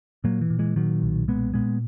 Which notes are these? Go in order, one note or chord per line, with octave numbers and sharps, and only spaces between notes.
A#2 F#3 A#3
E3
A#2
E3 G#3
A#2 D#3 F#3
B1
A#2 G#3 B3
A#2 G#3 B3